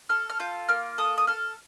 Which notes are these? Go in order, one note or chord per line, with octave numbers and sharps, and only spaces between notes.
A4 F6
F6
F4 G6
A#3 F6
A4 D#6
D#6
A4 F6